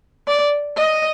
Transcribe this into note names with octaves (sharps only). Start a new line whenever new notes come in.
D5
D#5